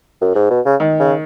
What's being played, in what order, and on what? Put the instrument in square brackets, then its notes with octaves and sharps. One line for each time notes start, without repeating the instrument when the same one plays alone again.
[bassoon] F#2
G#2
B2
C#3
[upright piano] D#3
[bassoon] C#3